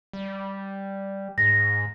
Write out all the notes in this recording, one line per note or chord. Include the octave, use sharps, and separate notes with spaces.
G3
G#2 A#6